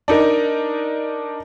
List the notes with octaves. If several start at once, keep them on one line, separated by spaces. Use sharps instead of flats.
D4 D#4 A#4